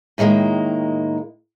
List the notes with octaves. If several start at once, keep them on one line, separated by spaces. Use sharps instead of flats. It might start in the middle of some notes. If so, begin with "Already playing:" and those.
A2 D#3 G3 G#3 A#3